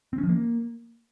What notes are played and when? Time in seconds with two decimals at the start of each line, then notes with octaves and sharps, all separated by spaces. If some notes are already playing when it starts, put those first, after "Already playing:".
0.13 C4
0.18 C#4
0.23 F3
0.29 A#3